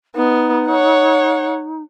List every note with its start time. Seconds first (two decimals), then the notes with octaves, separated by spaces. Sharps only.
0.15 B3 D#4
0.67 C#5 F#5